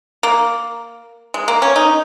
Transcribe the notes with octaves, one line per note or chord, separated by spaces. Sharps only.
A#3
G#3
A#3
C#4
D#4